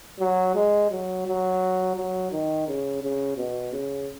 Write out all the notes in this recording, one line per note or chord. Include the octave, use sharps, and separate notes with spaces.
F#3
G#3
F#3
F#3
F#3
D#3
C#3
C#3
B2
C#3